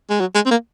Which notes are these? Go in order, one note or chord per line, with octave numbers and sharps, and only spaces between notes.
G#3
F#3
G#3
C4
A#3